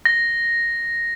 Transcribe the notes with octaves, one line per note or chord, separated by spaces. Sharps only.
A#6